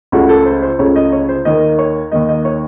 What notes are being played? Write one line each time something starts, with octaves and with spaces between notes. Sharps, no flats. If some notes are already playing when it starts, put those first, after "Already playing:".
C#2 C#3 A3 F#4
A4
C5
C5
C#2 C#3 A3 C#5
D#5
C#5
C5
D#2 D#3 A#3 D#5
C#5
D#2 D#3 A#3 D#5
D#5
C#5